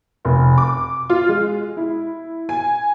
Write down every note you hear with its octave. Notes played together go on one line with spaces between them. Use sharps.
F1
D6
F4
G#3
E4
G#5